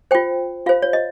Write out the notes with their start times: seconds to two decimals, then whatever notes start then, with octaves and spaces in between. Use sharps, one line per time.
0.11 F4 C5 G5
0.66 F4 C5 F5
0.82 C#5
0.93 D#5